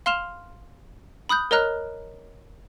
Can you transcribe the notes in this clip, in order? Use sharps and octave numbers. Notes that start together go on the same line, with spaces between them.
F5 C6 F6 E7 F7
B5 D#6 F#6 G6
A#4 C#5 D#5 A#5 F6 F#6